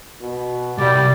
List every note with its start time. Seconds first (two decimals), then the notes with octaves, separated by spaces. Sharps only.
0.21 B2
0.78 C2 G3 D5